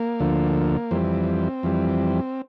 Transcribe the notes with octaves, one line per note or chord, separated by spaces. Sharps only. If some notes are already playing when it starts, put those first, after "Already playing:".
Already playing: A#3
D2 D3 F3
F2 E3 G3 C4
F2 E3 G3